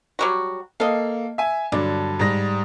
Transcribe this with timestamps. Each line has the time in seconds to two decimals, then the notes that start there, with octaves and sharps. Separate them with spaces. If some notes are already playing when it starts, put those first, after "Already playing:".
0.19 F#3 G3 F#4
0.80 A#3 A4 D#5 F5
1.38 E5 G#5
1.72 G2 D3 F#3 D4
2.19 G#2 G3 A#6